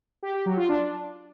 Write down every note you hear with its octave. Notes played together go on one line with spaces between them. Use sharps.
G4
G4
F#3
F4
D4